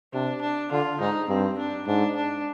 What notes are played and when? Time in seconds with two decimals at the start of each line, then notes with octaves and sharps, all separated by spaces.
0.13 C3 D4
0.42 D4
0.72 D3 F4
1.00 G#2 D#4
1.29 G2 C4
1.59 D4
1.87 G#2 D4
2.16 D4